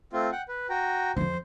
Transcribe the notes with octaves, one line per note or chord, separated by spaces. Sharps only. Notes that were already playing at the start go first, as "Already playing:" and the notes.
A3 C4 F4
F#5 G5
B4
F#4 G5 A#5
F2 F3 C5